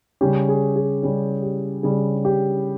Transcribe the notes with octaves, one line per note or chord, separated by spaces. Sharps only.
C#3 G3 C#4 G4
G#4
G#4
C#3 G3 C#4
G4
C#3 G3 C#4 G#4
G4